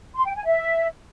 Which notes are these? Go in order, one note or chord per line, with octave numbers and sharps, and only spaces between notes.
C6
G5
G#5
E5